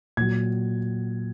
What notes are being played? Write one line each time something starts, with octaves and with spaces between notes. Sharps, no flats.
A#2 F#3 G#6